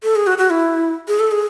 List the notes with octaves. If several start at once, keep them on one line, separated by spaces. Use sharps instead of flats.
A4
G#4
F#4
F#4
E4
G#4
A4
G#4